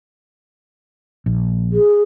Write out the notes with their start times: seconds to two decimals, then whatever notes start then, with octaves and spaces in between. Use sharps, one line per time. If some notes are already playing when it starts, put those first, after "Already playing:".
1.26 A#1
1.73 G#4